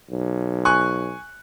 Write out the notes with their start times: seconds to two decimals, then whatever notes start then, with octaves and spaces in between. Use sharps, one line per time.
0.10 B1
0.65 G#5 C#6 F#6